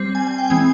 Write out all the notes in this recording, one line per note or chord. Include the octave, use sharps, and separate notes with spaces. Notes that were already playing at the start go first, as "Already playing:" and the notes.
Already playing: G3 C4
G#5
G#5
G5
E3 G#3 C4 G#5